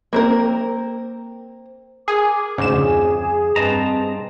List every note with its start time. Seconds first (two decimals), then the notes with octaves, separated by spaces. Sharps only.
0.13 A#3 C4 A#4
2.08 G#4 A#4 D6
2.58 D2 G#2 C#3 D6 E7
2.74 F2 G#4
3.56 G2 C4 B4 D#5 A5 A#5